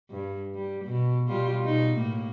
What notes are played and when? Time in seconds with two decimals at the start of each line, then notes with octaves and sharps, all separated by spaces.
0.11 G2
0.55 G3
0.84 B2
1.28 B2 G3 F4
1.64 B2 D#4
1.95 A2 A#3